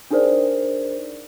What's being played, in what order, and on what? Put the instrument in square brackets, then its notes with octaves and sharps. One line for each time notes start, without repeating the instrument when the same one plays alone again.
[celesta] D4 D#4 G#4 A#4 C5 D5